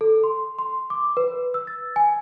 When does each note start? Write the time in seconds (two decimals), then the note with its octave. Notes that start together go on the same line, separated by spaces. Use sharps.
0.01 A4
0.24 C6
0.59 C6
0.90 D6
1.17 B4
1.54 E6
1.67 A6
1.96 G#5